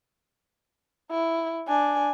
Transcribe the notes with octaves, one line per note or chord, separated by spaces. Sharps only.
E4
D4 G#5